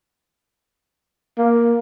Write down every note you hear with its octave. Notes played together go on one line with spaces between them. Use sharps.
A#3